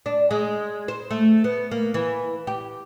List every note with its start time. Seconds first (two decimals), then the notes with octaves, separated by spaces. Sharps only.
0.06 D4
0.31 G#3
0.88 C5
1.11 A3
1.44 B3
1.71 A#3
1.94 E3
2.47 G4